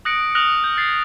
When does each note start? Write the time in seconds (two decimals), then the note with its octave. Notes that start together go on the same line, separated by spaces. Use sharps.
0.05 D#6 F#6 A#6 C#7 D7
0.35 D#6 F6 F#6 A#6 D#7 F7
0.64 G6
0.77 A6 C7